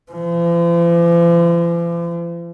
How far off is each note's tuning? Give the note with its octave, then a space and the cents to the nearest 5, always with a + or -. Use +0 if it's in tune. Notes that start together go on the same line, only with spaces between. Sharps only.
F3 -45